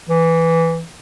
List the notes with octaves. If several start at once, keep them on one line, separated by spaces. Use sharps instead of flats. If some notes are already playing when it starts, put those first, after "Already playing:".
E3